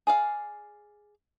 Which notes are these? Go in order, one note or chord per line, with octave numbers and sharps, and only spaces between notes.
G#4 D5 F5